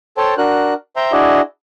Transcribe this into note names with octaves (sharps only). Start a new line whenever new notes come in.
A4 C5 C#5 G5 A5
D4 F#4 A#4 F#6
C5 E5 G5 A#5 C6
D4 E4 F#4 G#4 D5 D#5